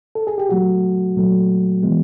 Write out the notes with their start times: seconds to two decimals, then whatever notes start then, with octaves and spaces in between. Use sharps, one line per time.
0.15 A4
0.27 G#4
0.38 G4
0.49 A#2 F#3 A3 F#4
1.16 A#2 F#3 A3
1.83 E3 G#3 B3